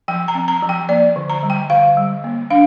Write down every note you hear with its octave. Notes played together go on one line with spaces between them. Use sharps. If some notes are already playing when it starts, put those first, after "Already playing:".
F3 G5
A#5
C4
A#5
F3
G5
A#3 D5
D3
A#5
G3
G5
D3 F5
G3
A#3
D4 F5